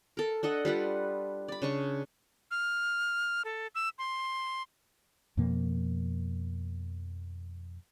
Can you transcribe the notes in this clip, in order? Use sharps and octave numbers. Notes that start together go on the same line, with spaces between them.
A4 A#4
D4 A4 D#5 F#5
G3 F4 B4 F#5
D5 B5
C#3 D4 C#6
F6
A4
E6
C6
F2 B2 F3 A#3